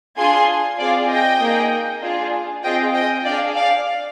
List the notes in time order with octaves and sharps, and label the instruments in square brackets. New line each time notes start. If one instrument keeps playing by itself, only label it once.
[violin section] D4 F4 G#4 G#5 C6
C4 F4 G#4 D5 F5
D#5 G5
A#3 D#4 G#4
D4 F4 G#4
C4 F4 G#4 D#5 G5
D#5 G5
D4 G#4 D5 F5
D5 F5